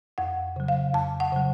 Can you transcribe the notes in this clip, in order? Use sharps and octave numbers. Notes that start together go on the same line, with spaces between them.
F2 F#5
C#3 F#3
F5
F2 A5
F#5
C#3 F#3